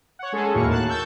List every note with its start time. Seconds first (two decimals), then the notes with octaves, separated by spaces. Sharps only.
0.19 C#5 F#5
0.33 G#3 C#4 G#4 A4
0.54 D#2 A2 A#3 F#4 A#4 C#6
0.70 A5 F#6
0.88 C#6 E6 G6 A6